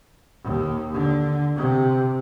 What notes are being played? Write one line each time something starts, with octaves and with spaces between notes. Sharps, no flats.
D#2
D3
C3